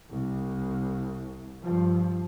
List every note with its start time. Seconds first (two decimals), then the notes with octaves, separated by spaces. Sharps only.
0.11 C2
1.62 G2 F3